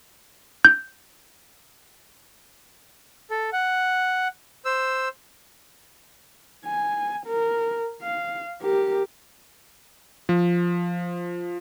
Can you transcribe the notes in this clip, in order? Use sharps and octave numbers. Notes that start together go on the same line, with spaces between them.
G6
A4
F#5
C5 E6
G#5
A#4
F5
G4 A#4
F3